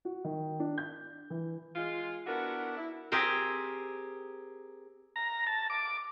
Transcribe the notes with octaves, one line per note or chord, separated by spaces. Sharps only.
F#4
D#3
D4
G6
E3
G#3 F4
B3 D4 E4 F#4 A#4
E4
C4 G4 G#4 A#4 C5
A#5
A5
D6